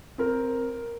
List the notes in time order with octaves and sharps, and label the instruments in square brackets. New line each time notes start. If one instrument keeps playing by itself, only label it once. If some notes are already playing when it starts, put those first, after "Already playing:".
[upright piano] C4 A#4